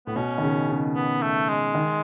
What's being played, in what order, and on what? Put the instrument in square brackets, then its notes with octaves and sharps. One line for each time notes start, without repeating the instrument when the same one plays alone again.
[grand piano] A2 [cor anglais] B3
[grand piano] B2 [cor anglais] C#4
[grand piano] D#3
C#3
C#3
[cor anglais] B3
A3
G#3
[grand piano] D#3